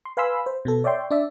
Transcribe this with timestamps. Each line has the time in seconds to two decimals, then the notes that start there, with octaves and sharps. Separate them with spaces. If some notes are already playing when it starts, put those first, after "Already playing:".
0.05 C6
0.17 B4 F5 G#5 B5 C6 E6
0.46 C5
0.65 B2 B3 A4
0.84 C#5 D5 E5 G5 C6
1.11 D4 D5 E5